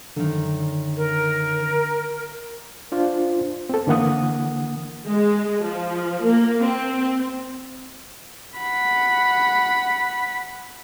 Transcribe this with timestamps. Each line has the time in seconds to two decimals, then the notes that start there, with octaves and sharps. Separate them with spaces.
0.17 F#2 D3 D#3
0.97 A#4
2.92 D4 F4 C5
3.69 C4 A4
3.87 D3 E3 A#3 F#5 D#6
5.07 G#3
5.63 F3
6.24 A#3
6.61 C4
8.58 F#5 B5